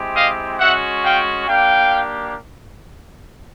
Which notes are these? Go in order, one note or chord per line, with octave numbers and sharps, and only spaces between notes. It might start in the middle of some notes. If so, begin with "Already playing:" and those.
Already playing: G#3 C4 E4 G4
D#5 F5
G#3 C#4 F#4 E5 F#5
F5 G5
A#3 D4 G4 F5 G5